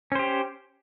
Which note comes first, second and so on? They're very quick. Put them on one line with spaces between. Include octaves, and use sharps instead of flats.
C#4 C5 G4